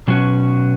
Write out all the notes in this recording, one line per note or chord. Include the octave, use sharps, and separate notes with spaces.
B2 F#3 C#4 F#4